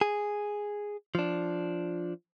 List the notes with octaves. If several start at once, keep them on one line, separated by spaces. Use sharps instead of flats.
G#4
F3 D4